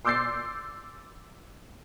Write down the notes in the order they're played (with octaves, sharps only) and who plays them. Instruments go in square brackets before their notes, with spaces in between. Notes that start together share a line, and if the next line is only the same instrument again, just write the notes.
[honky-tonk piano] C6 D6 E6 G6 A6 C7